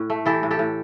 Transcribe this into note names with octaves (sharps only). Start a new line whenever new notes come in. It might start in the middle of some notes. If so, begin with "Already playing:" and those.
Already playing: A2
A3
E3 G4 A4
A2
G4 A4
A2